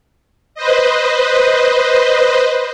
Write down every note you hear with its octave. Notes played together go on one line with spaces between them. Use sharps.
B4 C5 D#5